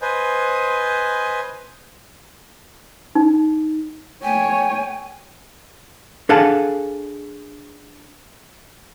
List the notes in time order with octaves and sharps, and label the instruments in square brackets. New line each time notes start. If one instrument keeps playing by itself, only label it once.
[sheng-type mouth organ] B4 C5 D#5 G#5
[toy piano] D#4
[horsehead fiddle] A3 C#5 [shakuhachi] G5 [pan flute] G#5
[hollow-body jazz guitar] D4 G#4 A4 F5 F#5 A5